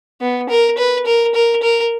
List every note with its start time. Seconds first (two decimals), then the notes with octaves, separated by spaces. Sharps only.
0.21 B3
0.50 A#4
0.78 B4
1.06 A#4
1.35 A#4
1.62 A#4